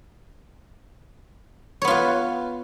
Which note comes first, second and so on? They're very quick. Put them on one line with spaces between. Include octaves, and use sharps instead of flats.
C#5 B3 F4 B4